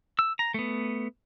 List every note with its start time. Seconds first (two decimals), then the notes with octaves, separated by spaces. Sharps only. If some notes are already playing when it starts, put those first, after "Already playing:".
0.19 E6
0.39 A#5
0.54 A3 B3